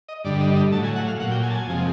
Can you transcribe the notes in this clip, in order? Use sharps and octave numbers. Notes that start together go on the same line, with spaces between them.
D#5
G2 D3 G3 D5
D#5
D#5
A2 F#3 A5
G#5
F#5
F5
A#2 F#3 F#5
G5
G#5
A5
G#5
F2 C3 F3 G#3